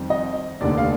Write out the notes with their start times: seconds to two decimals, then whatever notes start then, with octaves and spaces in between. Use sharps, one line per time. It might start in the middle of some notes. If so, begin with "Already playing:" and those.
Already playing: F2 D#3 G3 C4
0.10 D#5
0.61 F1 D#2 D3 D5
0.78 F5